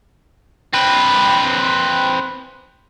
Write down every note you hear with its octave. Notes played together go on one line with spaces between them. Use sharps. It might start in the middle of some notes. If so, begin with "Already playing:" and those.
C4 B4